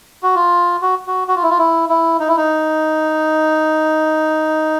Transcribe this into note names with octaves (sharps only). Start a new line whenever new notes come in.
F#4
F4
F#4
F#4
F#4
F4
E4
F4
E4
E4
D#4
E4
D#4